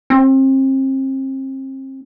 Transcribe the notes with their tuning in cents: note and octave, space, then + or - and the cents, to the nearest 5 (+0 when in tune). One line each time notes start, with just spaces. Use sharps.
C4 +35